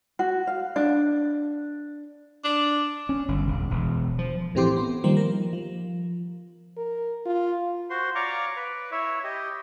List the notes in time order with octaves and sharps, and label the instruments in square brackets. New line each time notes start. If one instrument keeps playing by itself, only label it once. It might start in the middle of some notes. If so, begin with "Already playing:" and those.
[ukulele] F#4
F5
D4
[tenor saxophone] D4
[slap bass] C#4
G1
E1
E1
F3
[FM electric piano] A2 E3 C4 G4 C6 D6
B3
D#3 F3 G3 A#3 C5
A#4
F3
[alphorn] A#4
F4
[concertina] F#4 C5 C6
C#5 D5 F5 A#5 C#6 D6
B4
E4 C#5 E5
G4 D#5